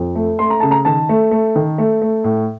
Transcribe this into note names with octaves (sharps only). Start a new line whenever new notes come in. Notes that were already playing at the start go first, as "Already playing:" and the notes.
Already playing: F2
A3
A3 C6
A#5
C#3 A5
A#5
D#3 A5
A3
A3
D#3
A3
A3
A2